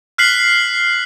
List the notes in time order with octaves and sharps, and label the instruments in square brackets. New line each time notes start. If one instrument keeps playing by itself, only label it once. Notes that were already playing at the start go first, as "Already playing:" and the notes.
[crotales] F6 F#6 B6 C7 F#7